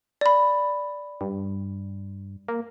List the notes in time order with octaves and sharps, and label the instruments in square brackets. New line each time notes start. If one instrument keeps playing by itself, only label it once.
[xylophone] D5 B5
[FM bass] G2
A#3